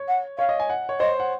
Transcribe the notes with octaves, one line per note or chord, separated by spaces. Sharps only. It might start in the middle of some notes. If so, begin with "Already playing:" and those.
Already playing: C#5
F#5
C#5 F5
D#5
G#5
F#5
C#5
C5 D#5
F#5